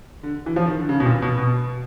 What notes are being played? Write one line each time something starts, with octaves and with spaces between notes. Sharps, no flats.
D3
E3
F3
D#3
D3
C#3
B2
A#2
B2
B2